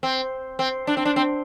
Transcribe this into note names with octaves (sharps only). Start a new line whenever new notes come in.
C4
C4
D4
C4
D4
C4